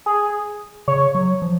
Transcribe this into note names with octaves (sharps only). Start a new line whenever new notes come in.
G#4
C#3 C#5
F#3
F3